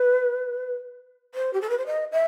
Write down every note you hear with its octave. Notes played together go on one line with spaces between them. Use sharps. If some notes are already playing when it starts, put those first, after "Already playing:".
Already playing: B4
C5
G4
A4
B4
C5
D#5
E5